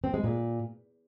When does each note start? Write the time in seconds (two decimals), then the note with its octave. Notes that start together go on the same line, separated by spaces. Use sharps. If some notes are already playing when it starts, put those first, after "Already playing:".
0.04 C4
0.14 G#3
0.24 A#2